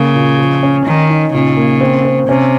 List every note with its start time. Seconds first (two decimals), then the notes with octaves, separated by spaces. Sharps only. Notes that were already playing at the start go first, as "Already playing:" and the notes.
Already playing: C#3 A#3
0.15 A#2
0.39 F3
0.63 C#4
0.86 D#3 D#4
1.10 D#4
1.33 A#2 C#3
1.57 A#3
1.81 C4
2.05 C4
2.28 C3 C#4